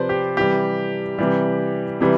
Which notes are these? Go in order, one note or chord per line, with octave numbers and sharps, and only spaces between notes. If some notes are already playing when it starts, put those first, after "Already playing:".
Already playing: C3 F3 B4 C5 D5
G4
C3 E3 G3 G4
C3 E3 G3
C3 E3 G3